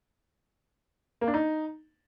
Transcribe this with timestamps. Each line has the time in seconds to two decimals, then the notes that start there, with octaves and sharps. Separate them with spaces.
1.21 A#3
1.28 D4
1.34 D#4